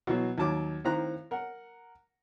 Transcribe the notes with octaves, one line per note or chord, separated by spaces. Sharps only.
B2 E3 F#3
D#2 F#3 A5 D6
A2 D#3 C4 F5 A#5 F#6
A#4 F#5